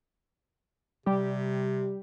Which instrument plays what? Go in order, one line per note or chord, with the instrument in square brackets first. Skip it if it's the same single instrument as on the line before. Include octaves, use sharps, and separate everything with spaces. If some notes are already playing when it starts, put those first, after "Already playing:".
[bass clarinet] C3 [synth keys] G3 G4